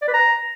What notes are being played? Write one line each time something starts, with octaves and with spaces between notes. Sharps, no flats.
D5
B4
A#5